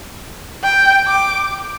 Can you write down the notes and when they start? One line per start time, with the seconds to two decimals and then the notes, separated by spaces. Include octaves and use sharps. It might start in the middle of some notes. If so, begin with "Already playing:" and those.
0.63 G5
1.07 D6